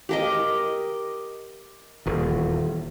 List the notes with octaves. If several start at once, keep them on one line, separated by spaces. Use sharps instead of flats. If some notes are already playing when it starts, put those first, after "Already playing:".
G4 A#4 D#5
D#1 E2